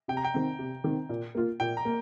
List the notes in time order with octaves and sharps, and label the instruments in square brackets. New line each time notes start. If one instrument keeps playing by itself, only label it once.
[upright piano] C3 [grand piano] G5
[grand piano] A#5
G5
[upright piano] D#3 C4
C3
D#3 C4
A#2
A#3 F4
[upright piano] A#2 [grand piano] G5
[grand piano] A#5
[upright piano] A#3